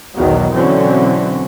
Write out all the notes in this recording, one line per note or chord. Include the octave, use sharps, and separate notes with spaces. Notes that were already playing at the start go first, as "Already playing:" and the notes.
B1 E2 B2 D#3 F#3
B2 D3 E3 F#3 C4 C#4